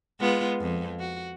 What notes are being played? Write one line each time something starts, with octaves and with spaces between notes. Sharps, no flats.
G#3 B3 F4
F2
F#4